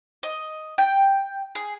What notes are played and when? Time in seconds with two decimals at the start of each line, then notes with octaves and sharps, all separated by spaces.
0.23 D#5
0.78 G5
1.55 G#4